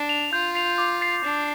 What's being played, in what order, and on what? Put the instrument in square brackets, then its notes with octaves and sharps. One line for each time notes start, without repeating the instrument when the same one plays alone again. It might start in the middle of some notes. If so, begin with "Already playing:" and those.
Already playing: [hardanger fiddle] D4
[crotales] F7
[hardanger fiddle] F4 [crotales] G6
[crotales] C7 F7
D6
A6 C7 F7
[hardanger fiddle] D4 [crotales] A6